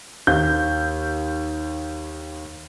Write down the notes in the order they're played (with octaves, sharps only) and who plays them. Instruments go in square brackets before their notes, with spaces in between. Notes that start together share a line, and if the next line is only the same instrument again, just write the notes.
[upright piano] D#2 G6